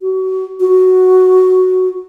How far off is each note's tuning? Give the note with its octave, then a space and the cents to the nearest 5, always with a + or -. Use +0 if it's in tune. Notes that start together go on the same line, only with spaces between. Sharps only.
F#4 +35
F#4 +5